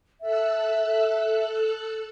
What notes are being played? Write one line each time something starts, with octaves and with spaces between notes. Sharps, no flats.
A4 E5 E6 F#6